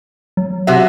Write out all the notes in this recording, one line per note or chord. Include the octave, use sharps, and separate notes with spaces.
F#3
C3 F#4 E5